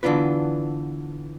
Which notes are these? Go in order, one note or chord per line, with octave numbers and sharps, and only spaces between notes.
D3 E3 B3 D4 F4 B4